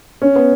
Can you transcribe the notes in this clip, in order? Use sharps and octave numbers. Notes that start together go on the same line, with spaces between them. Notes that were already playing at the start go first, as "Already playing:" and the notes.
C#4
B3